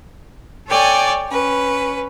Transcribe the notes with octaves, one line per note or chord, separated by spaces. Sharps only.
A4 C#5 D5 G5 G#5
C#4 B4